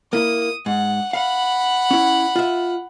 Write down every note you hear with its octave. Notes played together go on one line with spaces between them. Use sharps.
A#3 E4 D#6
G#2 F#5
F5 F#5 B5
C#4 E4
F4 E5